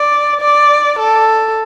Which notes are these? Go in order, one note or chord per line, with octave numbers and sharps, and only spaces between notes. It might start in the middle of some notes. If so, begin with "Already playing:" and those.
Already playing: D5
D5
A4